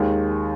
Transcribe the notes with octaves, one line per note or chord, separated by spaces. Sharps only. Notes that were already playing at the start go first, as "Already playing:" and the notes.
Already playing: D#2 D#3 G#3